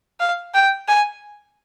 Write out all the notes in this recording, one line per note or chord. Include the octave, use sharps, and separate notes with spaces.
F5
G5
G#5